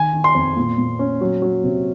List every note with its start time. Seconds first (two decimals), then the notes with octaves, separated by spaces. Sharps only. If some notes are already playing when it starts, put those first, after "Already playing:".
Already playing: D#3 G#5
0.13 D#3
0.24 C6
0.35 F2
0.57 A#2
0.78 A#2
0.99 C#4
1.21 F#3
1.42 F#3
1.64 C3